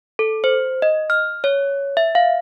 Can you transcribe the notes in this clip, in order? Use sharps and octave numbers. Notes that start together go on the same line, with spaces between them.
A4
C5
D#5
F6
C#5
E5
F5